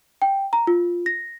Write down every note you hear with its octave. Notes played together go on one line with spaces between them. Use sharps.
G5
A#5
F4
A#6